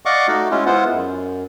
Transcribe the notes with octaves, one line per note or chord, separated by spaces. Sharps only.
D5 D#5 F5 F#5 C#6 D6
A3 D#4 F#4
G#3 C#4 E4 F4
G#3 B3 E4 F4 C5 F#5
F#2